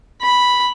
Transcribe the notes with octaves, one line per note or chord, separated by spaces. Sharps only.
B5